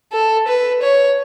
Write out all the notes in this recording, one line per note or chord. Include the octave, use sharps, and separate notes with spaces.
A4
B4
C#5